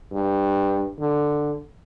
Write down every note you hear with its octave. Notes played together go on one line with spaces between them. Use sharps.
G2
D3